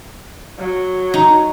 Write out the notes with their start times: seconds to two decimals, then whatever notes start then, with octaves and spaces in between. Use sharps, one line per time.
0.59 F#3
1.14 D#4